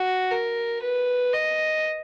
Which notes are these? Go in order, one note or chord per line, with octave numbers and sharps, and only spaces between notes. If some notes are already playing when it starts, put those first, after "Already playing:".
Already playing: F#4
A#4
B4
D#5